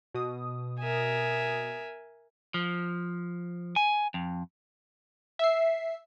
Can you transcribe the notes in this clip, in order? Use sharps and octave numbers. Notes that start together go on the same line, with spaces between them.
B2 D#6
A#4 E5 G#5
F3
G#5
F2
E5 C7